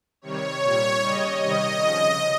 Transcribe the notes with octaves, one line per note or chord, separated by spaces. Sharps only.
C3 D#3 G3 C#5
A#2 G3
C#3 G3 D#5
C3 D#3 G3 D#5
C#3 F3